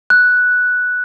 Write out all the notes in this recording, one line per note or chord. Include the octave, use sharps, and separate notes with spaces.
F#6